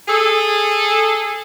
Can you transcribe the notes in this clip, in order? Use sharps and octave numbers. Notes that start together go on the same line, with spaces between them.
G#4 A4